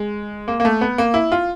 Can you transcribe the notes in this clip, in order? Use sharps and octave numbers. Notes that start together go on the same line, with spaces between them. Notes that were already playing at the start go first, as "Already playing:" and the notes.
Already playing: G#3
A#3
A#3
A3
B3
A#3
E4
F4